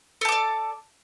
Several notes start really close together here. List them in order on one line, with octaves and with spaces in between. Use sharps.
A4 A5 D6 D5